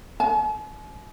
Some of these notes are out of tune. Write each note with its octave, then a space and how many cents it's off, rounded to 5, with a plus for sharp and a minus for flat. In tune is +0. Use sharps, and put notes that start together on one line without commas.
G#5 +45